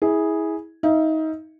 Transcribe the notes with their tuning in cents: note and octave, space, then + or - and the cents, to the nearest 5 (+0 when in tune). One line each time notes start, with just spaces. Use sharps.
E4 -25 G#4 +0
D#4 +25 E5 +45